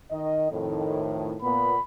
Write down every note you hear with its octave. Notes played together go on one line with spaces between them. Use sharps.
D#3 D#5
F2 A2 D#3
A#2 B3 B5